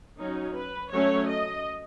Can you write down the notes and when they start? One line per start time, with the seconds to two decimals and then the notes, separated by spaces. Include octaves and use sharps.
0.19 F#3 C#4 D#4
0.56 B4
0.92 F#3 A3 C#4 C#5
1.29 D#5